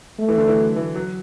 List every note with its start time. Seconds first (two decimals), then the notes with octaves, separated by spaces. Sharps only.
0.19 A3
0.29 E3
0.38 D3
0.48 E3
0.57 F#3
0.76 E3
0.96 F#3